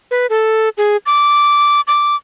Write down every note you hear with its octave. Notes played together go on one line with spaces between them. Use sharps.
B4
A4
G#4
D6
D6